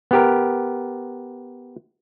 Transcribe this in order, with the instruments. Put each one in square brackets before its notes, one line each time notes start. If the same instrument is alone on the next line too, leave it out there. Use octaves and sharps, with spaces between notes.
[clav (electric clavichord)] B3 G4 A#4